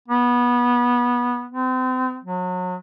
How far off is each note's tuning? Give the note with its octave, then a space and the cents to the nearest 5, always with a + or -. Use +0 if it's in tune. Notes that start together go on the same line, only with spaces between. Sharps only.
B3 -20
C4 -35
F#3 -30